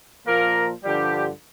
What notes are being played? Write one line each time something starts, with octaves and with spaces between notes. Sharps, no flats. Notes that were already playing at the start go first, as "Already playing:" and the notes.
A#2 F3 A#3 A#4
G2 D3 F3 G3 G4